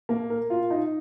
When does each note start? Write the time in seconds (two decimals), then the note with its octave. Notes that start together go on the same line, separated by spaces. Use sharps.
0.09 A#3
0.30 A#4
0.50 F4
0.70 D#4